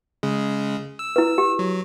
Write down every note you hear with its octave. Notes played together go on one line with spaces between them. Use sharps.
C#3 G#3
E6
E4 B4
G4
F#3